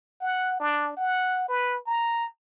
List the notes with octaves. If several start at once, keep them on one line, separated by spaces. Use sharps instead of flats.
F#5
D4
F#5
B4
A#5